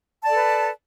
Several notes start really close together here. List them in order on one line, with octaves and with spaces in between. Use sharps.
A5 D5 A4 B4